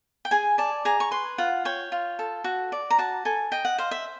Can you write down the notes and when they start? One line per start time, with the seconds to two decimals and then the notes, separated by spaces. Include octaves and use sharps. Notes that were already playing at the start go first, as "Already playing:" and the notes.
0.25 G5
0.31 G#4 G#5
0.58 D5 A5
0.85 G#4 A#5
1.00 C#6
1.11 B4 C6
1.38 F4 F#5
1.65 C#5 G5
1.92 F4
2.19 A4
2.44 F#4
2.72 D5
2.90 A#5
2.98 F#4 A5
3.25 A4 G#5
3.52 D#5 G5
3.65 F#5
3.78 C5 F5
3.91 E5